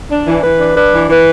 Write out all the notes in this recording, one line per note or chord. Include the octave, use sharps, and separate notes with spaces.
D4
E3
E3 B4
D4
D4 B4
E3
E3 B4